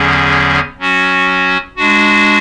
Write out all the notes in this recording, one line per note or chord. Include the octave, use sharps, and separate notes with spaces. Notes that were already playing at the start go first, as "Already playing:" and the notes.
Already playing: E2 D3 F#3 C#4 G#4
F#3 C#4 F#4
G#3 D4 F#4